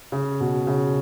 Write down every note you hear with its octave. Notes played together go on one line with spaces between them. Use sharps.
C#3
B2
C#3